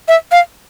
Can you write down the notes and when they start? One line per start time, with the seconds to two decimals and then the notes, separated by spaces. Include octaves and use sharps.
0.08 E5
0.32 F5